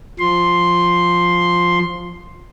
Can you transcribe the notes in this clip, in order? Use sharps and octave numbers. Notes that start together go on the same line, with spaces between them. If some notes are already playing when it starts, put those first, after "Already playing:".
F3 C6